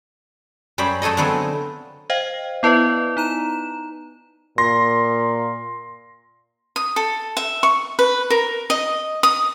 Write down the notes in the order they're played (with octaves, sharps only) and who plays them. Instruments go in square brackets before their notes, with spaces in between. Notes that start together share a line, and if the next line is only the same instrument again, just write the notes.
[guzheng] F#2 G3 C#4 C5 B5
F#3 A3 G#4 A4 D#5
D3 F3 F#3 B3 C4
[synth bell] C5 D#5 F5 G5
B3 E4 B4 D5 D#5
D#4 A#5 E7
[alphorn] A#2 [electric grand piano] C6 A#6
[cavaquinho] D#6
A4
E5
C#6
B4
A#4
D#5
D#6